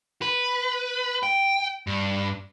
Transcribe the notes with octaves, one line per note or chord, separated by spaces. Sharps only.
B4
G5
G2